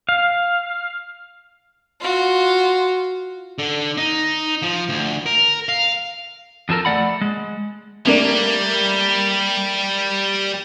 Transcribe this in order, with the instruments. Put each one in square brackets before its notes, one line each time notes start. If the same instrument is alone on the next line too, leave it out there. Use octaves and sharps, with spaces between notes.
[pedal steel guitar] F5
[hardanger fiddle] F4 F#4
[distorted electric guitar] D3
D#4
F3
D2
A#4
F5
[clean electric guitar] F2 F3 A4 A#4
A3 D5 F#5 B5
G#3
[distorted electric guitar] G3 [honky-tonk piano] A3 A#3 D4